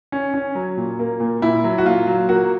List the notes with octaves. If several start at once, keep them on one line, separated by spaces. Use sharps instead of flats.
C#4
C#4
F#3
A#2
A#3
A#2
A#2 E4
F#3
F#4
A#2 F4
F#3
A#3 F#4